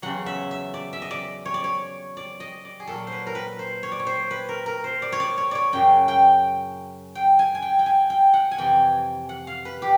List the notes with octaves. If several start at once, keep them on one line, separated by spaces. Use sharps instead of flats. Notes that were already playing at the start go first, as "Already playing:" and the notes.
E2 C#3 F#3 F#5
E5
E5
D5
E5
D#5
D5
C#5
D5
C#5
D5
D#5
D5
G#4
A#2 F#3 A4
C5
B4
A#4
B4
C5
C#5
D5
C#5
C5
B4
A#4
A#4
C5
D5
C#5
D5
C#5
C#5 D5
F#2 C#3 F#3 G5
G5
G5
G#5
G#5
G5
G5
G#5
G5
F#5
G#5
F2 C3 E3 G5
F#5
F5
B4
G4